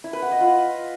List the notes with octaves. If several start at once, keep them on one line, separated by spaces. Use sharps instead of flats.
E4
B4
F#5
D#5
F4